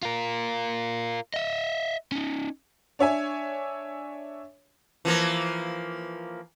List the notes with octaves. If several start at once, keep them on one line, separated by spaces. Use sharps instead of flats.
F4 A#4
D#5 E5
C#4 D#4
D4 C#5 E5 G#5
E3 F3 A#3